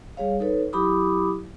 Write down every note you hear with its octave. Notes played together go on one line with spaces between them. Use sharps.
G3 G#4 C#5 F5
D#4 A4 B4 C#5
F#3 E4 G4 B5 D6 D#6